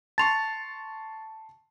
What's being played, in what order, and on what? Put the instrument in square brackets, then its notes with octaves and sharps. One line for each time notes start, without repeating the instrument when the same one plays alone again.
[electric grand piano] A5 C6 C#6 [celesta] A6 F7